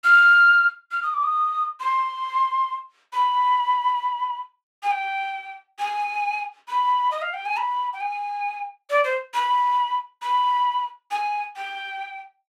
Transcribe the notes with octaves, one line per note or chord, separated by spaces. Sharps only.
F6
F6
D#6
D6
D#6
C6
B5
G#5
G5
G#5
B5
D#5
F5
G5
G#5
B5
G5
G#5
D5
C5
B5
B5
G#5
G5